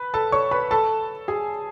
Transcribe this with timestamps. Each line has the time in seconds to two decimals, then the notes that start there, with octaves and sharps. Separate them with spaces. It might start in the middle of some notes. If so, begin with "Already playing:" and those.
Already playing: B4 B5
0.14 A4 A5
0.32 C#5 C#6
0.51 B4 B5
0.71 A4 A5
1.28 G#4 G#5